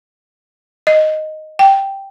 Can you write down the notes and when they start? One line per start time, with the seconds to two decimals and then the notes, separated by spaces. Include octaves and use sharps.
0.87 D#5
1.59 G5